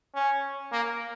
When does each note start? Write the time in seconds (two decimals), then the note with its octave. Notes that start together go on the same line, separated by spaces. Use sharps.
0.14 C#4
0.73 A#3